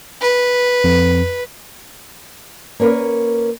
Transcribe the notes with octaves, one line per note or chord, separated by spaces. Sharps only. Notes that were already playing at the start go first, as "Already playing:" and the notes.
B4
F2
A#3 C#4 A#4 B4